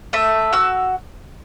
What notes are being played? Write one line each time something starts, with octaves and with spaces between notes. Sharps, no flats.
A3 E5
F#4 E6